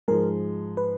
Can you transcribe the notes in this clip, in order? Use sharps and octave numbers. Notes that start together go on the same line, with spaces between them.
G#2 F3 G#3 A#4
B4